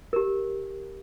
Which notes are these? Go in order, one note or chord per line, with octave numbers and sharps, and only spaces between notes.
G4 A#4